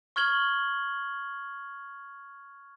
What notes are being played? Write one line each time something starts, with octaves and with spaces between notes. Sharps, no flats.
C#6 F6 G#6 F#7 G7